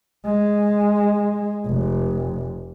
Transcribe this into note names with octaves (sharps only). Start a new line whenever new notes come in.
G#3
F1